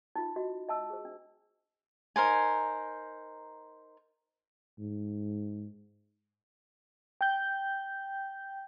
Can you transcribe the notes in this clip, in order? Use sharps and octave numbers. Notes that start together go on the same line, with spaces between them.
D#4 F4
F#4 D#5
D#5 A5 E6
G#4 C5
D4
D#4 A#4 C5 G#5
G#2
G5 G6